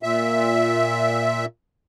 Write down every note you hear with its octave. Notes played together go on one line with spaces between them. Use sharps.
A#2 E5